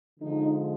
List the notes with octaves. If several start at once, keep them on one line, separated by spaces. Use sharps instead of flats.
D3 F3 G#3 D#4